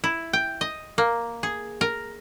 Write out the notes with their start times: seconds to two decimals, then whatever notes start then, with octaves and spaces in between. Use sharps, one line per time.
0.04 E4
0.33 G5
0.61 D#5
0.98 A#3
1.43 G#4
1.81 A#4